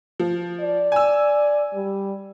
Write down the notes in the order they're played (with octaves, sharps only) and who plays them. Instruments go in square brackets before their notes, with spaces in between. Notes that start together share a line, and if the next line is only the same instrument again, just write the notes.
[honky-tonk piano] F3
[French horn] D5
[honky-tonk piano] G#5 E6
[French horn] G3